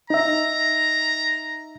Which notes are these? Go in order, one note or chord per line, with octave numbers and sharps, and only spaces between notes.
D#4 E5 A#5